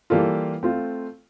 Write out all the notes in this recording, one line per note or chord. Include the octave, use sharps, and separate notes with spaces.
E3 G3 A#3 F4 A4
A3 C4 F4